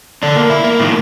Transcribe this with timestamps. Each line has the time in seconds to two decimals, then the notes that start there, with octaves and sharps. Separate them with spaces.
0.23 D3 D4
0.36 A#3
0.50 E4
0.64 A#3
0.80 A2 D#3